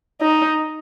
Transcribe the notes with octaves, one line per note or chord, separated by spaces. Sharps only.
D#4